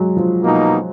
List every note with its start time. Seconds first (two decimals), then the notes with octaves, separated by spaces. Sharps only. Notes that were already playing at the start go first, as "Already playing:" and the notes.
Already playing: F#3 G#3
0.17 F3
0.42 B2 A#3 D#4